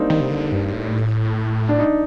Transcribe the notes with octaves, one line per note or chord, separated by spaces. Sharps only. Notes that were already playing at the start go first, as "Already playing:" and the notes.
Already playing: G3 A#3 C4 D4 D#4
D#3
C3
D3
G2
A2
D4
D#4